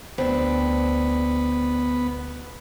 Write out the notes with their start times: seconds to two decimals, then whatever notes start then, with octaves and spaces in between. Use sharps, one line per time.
0.18 D2 B3 C4 D4